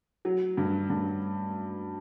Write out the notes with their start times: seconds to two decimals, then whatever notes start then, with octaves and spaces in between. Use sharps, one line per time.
0.25 F#3
0.57 G2
0.90 G2